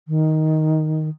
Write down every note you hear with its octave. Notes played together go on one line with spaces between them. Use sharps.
D#3